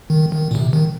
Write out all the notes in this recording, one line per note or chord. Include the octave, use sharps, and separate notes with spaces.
D#3
D#3
A#2
C3
D#3